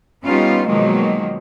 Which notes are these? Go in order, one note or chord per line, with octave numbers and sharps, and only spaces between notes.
G3 B3 C#4 D#4 F4
B2 D#3 F3 F#3 G#3 A#3